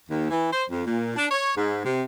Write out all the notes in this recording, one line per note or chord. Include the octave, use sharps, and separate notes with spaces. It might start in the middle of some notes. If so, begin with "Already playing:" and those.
D#2
E3
C5
F2
A#2
D4
C#5
G#2
C3